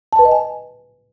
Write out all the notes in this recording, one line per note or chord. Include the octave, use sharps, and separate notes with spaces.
A5
B4
D#5
G#5